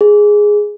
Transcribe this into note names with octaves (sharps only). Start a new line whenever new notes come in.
G#4